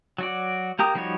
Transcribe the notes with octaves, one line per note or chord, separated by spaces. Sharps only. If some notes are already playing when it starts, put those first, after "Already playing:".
F#3 F#4 D5
A#3 G4 A#5 D#6
F3 G3 D#4 F#4 C#5